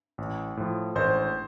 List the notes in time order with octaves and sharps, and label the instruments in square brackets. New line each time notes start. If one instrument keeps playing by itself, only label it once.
[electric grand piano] A1
A2 F3
[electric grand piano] A1 [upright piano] C5